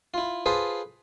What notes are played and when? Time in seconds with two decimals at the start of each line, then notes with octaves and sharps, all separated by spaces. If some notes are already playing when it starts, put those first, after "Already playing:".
0.14 E4 F4
0.46 F4 G#4 A4 B4 C5